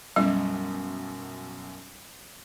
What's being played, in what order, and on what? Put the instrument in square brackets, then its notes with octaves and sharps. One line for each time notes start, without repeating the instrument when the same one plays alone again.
[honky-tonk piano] B1 F#2 [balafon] G3 D#5